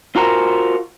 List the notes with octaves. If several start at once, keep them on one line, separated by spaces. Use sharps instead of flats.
F4 F#4 A#4 C5